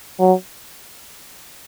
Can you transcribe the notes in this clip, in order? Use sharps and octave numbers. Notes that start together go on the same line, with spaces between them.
F#3